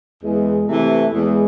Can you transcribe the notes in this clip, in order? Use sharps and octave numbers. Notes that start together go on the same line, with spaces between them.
E2 G#3
C3 E3 A3
E2 G#3